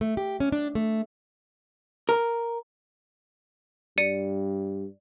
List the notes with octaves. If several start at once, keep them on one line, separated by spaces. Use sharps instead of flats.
A3
G4
C#4
D4
A3
A#4
G2 D5 C#7 D#7